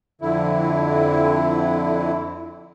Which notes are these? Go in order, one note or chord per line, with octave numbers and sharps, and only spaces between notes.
F2 D3 E4